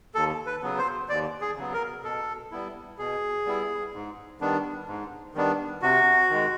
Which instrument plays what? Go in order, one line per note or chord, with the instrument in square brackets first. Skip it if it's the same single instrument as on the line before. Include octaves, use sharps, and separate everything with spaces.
[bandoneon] D#2 A4
B4
C#3 F#3 B3
C5
D#2 D5
G#4
C#3 F#3 B3
A#4
B2 A4
G3 B3 E4
B2 G#4
G3 B3 E4
G#2
D#3 G3 B3 D4
G#2
D#3 G3 B3 D4
C3 F#4
D#3 G#3